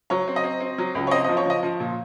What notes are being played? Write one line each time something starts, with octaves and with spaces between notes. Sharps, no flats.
F#3 C#5
C4
D#5
C4
C4
F#3
C#2
C#5
C4 D#5
F3 D#5
C#5
F3 D#5
F3
A#2